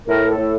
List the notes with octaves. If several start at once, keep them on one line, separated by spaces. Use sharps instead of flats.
A2 A#4
A4
A2